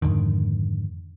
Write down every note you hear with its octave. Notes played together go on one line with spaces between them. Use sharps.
F2 G#2 D3 D#3